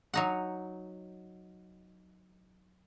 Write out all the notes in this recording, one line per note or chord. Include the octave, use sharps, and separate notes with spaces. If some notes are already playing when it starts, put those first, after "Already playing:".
F#3 D#4 F#5